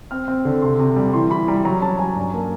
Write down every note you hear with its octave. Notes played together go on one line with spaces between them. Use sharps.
C4 F6
C4
D3
C3 C6
C3
G3
E3 C6
E3 B5
G3 A#5
F#3 A#5
C#4 A5
F#3 G#5
G2
A#3